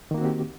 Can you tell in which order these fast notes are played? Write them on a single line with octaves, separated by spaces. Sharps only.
D#3 A#3 F#4 C4 G4